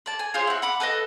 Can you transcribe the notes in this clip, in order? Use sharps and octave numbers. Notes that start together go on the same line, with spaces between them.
D5 A5
G#5
F4 G#4 C5 C#5
E4 F#4
F#5 B5 D6
A4 B4 C#5 D#5